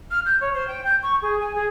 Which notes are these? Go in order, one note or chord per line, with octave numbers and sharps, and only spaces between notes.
F6
G6
C#5
C5
G5
G6
C#6
G#4
G#5
G#4